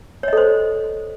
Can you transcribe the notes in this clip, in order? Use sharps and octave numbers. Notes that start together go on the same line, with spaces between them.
A4 C5 C#5 D#5